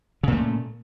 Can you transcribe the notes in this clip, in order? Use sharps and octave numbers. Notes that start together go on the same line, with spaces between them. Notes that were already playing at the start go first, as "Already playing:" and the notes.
A#2 C#3 A3